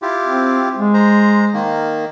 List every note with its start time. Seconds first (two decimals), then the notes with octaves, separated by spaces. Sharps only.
0.02 E4 F4 G4
0.25 C4
0.77 G#3
0.94 C5 A#5
1.54 D#3 A#3